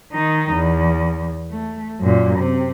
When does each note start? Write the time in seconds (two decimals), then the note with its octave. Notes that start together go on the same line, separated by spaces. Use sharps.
0.12 D#3 D#4
0.53 E2
1.52 A3
2.00 F#2 A#2
2.39 C3